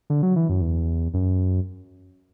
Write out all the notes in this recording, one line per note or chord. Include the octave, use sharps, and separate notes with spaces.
D3
F#3
E3
F#2
E2
F#2